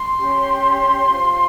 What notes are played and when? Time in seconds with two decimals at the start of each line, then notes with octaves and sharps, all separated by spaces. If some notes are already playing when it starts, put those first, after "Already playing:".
Already playing: C6
0.18 C#4 G4 C#5
1.10 F4 C5